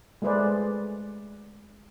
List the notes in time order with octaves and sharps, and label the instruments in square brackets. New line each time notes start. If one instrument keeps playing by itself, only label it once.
[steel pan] G#3 A3 G#4 B4 C5 D5